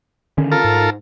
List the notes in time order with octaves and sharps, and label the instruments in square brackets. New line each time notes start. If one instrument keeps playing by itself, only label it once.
[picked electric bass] D3 D#3 C#4
[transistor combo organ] F4 A4 A#4
[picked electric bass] G#2